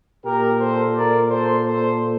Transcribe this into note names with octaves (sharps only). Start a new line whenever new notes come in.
A#2 G4 A#4
A4 C5
A#4 D5
A4 C5
A4 C5